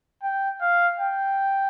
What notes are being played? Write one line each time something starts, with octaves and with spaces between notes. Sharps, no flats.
G5
F5
G5